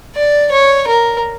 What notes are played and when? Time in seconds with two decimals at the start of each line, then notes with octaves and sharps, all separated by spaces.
0.15 D5
0.51 C#5
0.87 A#4